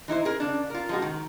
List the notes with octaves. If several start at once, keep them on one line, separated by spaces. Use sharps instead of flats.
E3 D#4 E4 C5
G#4 A#4
C#3 D4
F4 A#4
F3 G#3 F#4
D#3